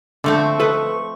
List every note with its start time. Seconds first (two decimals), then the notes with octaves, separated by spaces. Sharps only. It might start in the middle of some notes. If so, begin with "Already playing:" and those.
0.24 D3 F3 A3 C4 C#6
0.60 A4 B4 D#5